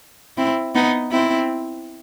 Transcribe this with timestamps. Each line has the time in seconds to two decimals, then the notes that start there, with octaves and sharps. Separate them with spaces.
0.37 C4 E4
0.75 B3 D#4
1.11 C4 E4